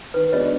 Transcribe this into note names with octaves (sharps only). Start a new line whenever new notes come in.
D#3 B4
G#3 B3 D4 F#4 C#5 D#5